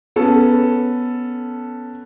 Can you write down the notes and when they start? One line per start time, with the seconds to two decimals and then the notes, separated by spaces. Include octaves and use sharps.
0.16 B3 C#4 A4